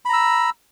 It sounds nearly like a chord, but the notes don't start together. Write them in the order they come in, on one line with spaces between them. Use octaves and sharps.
B5 A#5 E6